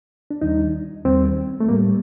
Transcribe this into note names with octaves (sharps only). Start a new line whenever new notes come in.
D4
D#2 D#3 G3 D#4
D#2 D#3 G3 C4
A3
A2 G3 A#3